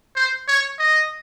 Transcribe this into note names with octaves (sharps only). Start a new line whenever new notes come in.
C5
C#5
D#5